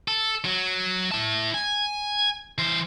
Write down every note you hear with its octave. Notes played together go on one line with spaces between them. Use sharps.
A4
F#3
E4 A5
G#5
E3 C5